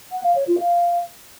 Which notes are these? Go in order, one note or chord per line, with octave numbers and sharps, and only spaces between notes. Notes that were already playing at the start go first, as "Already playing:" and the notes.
F#5
F5
C#5
F4
F5